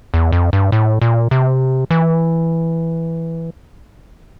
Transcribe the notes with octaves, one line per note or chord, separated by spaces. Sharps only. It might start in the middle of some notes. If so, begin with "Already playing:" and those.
E2
F2
G2
A2
A#2
C3
E3